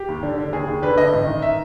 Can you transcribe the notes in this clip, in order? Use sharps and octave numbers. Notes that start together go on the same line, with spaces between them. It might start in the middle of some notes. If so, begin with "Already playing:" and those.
Already playing: G4
D#2
D3
D3
D#2 G#4
D#2
D3 B4
D3 D#5
A1
D#3
E5